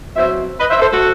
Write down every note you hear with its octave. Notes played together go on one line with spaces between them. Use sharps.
B2 F#3 C4 C5 E5
B4 D#5
C5 E5
A4 C5
F#4 A4